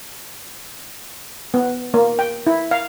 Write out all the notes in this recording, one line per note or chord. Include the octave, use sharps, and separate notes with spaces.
B3
A#3
G5
E4
F5